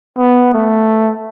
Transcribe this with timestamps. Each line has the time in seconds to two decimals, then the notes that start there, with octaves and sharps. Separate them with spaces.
0.17 B3
0.53 A3